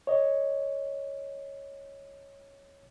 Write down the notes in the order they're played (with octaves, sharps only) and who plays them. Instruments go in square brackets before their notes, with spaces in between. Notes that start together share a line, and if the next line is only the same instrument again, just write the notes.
[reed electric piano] C#5 D#5